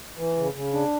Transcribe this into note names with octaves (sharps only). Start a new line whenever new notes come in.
E3
C#3
C#3
D4